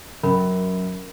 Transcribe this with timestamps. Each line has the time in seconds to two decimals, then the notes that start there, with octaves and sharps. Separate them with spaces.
0.23 F#2 C#4 A#4 B5